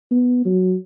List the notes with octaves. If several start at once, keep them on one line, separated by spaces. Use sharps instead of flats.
B3
F#3